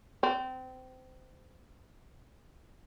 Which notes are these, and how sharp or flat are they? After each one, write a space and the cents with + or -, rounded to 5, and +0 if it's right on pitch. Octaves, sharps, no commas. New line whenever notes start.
C4 -25